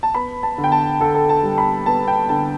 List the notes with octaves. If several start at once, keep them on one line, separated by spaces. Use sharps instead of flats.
A5
B3 B5
A5
D3
G5
A5
D3 A4
A4
A5
G3
B5
B3 A5
G5
D3 A5